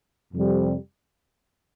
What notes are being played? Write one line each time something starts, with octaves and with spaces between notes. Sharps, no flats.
F2 C3 G3